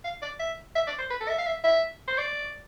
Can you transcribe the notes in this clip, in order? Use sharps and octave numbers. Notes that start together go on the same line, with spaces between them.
F5
D5
E5
E5
D5
C5
B4
A4
E5
F5
E5
E5
C5
D5